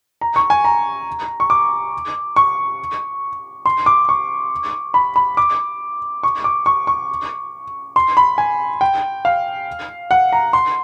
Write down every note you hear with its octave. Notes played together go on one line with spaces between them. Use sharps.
A#5
C#6
G#5
A#5
C#6
D6
C#6
C6
D6
C#6
B5
B5
D6
C#6
D6
C#6
C#6
C6
B5
G#5
G5
F5
F#5
A#5
C6